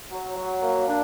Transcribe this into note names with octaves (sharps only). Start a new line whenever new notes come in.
F#3
F#3
A#3
D4